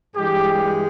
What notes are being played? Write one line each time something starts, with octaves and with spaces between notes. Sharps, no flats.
G2 E3 G#3 G4